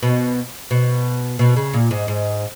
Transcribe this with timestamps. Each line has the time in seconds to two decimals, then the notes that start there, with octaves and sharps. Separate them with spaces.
0.03 B2
0.71 B2
1.39 B2
1.56 C#3
1.73 A#2
1.91 G#2
2.08 G#2